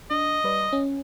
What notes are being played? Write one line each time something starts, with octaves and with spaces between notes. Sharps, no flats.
D4 D#5
G3 B4 D5
C#4